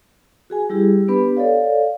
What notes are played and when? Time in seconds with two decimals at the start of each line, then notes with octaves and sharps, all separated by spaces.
0.50 F#4 G#4 G#5
0.70 G3 E4 G4 G#4
1.08 B3 D4 G4 B4 B5
1.37 A4 C#5 D5 F5